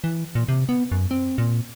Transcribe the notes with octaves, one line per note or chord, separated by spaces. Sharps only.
E3
A#2
C3
B3
F#2
C4
A#2